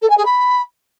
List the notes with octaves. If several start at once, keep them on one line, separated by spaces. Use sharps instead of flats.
A4
G#5
G#4
B5